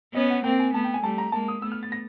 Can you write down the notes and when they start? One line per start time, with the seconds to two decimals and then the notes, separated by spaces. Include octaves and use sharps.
0.14 B3 C#4 D#5
0.30 F#5
0.44 A#3 C4 G5
0.60 G#5
0.74 A3 B3 A5
0.84 G5
0.94 G#5
1.03 G3 A3 A5
1.18 A#5
1.32 G#3 A#3 A5
1.48 D#6
1.62 A3 B3 E6
1.72 F6
1.83 A6
1.92 A#6